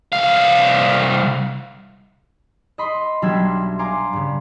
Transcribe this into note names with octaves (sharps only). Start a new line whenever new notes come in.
C2 F5
D#5 B5 C6
B1 G3 D4 E5 C6 G#6
F5 G#5 A#5 C6 D6
G2 C#3